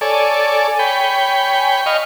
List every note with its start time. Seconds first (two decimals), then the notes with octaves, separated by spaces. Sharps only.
0.01 A4 C#5 D5 G#5
0.79 C#5 G5 B5
1.86 D#5 F5 C#6